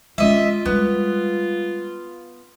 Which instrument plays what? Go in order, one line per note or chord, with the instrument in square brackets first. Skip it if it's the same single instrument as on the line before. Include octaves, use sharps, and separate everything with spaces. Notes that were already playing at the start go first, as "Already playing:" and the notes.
[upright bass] G#3 C#4 [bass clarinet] F4 [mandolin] D#5 E5
[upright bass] G3 G#3 [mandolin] B3